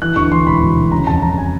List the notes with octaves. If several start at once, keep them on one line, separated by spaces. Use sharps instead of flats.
E3 F#6
D2 C#6
E3 C6
E1 B5
E1
E1
C#3 A#5
F2 A5
F2 A#5
G#5